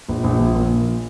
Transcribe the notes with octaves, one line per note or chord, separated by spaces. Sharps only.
A#1
A#1
F3
A#2